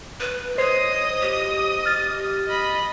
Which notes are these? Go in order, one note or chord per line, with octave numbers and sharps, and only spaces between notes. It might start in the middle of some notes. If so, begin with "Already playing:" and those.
B4
C5 C#5 D#5 D#6
G4
F6 A6
D#5 B5